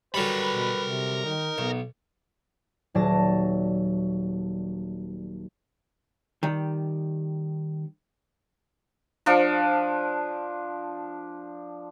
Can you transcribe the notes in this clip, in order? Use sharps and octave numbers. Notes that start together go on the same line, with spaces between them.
D3 F#3 G3 A#4 B4 B5
B2
C3
D#3 D#4
B1 B3
D#1 F#3 D5 A5 A#6
D#3 G3
F3 D4